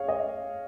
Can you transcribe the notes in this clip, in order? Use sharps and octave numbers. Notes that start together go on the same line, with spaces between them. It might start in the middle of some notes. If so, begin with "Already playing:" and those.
Already playing: G#4 C#5 F5
D#5